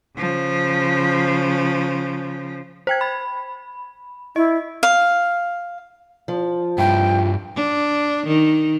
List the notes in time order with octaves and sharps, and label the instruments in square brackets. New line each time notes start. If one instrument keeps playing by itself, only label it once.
[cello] C#3 F3
[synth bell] C5 G5 G#6
B5
[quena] E4 [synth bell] D#5
[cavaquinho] F5
[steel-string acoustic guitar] F3
[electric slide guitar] G2 E4 [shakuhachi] G5
[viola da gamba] D4
D#3